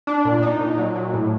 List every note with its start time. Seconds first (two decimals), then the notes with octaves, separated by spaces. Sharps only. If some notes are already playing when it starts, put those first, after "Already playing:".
0.07 D4
0.25 A#2
0.42 D#4
0.60 A#2
0.78 F#3
0.95 F#3
1.13 A2